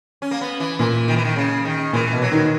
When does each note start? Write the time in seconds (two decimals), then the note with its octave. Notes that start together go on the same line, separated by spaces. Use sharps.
0.22 C#4
0.31 A#3
0.41 B3
0.60 E3
0.79 A#2 E3
1.08 D#3
1.16 E3
1.25 D#3
1.36 C#3
1.65 D#3
1.93 A#2 E3
2.13 B2
2.22 F#3
2.32 D#3